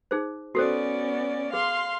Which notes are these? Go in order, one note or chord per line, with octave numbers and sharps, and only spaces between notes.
D#4 G#4 C5
B3 C#4 F#4 A4 C5 D5
G#4 F5 C6